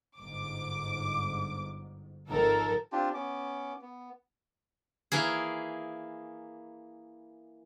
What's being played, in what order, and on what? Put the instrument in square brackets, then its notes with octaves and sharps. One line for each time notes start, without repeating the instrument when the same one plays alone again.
[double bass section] G1 G#2 [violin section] D6
[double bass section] G#1 D#3 F3 [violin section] A4 A#4
[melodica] C4 D4 F4 G4
B3 C#4 D6
B3
[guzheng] E3 A#3 G#4